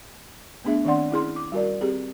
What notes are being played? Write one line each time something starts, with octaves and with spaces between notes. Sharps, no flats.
A3 B3 D4 G#4 E5
D#3 C4 D4 D5 F#5 C6
C#4 E4 G#4 C6
D6
G3 F#4 A#4 D5
C4 G4 G#4